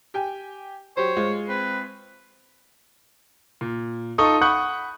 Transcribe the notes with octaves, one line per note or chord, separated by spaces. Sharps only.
G4 G5 G#5
F#3 G4 C5 C#5
G#3 F4
C4 B4
A#2
D#4 F4 A4 C#6 D#6
F#5 B5 C#6 D#6 F#6 G6